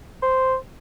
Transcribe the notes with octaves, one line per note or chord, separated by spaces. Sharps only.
C5